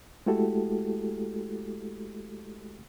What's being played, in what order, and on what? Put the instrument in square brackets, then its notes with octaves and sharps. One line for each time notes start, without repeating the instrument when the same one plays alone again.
[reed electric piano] G#3 A3 E4 F#4 G4 A4